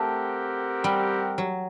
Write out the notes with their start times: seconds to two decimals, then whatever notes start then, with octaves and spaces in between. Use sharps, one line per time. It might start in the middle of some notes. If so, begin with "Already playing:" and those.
Already playing: A3 C4 G4 A#4 F#5
0.84 G3
1.38 F#3